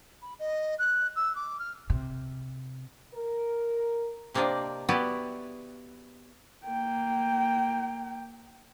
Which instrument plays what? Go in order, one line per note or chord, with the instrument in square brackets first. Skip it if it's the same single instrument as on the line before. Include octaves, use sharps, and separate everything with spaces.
[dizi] B5
D#5
F#6
E6
D6
F6
[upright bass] C3
[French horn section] A#4
[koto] C3 A#3 C4 D4 D5 D#5
B3 E4 F#4 G4 B4 D5
[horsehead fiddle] A#3 G5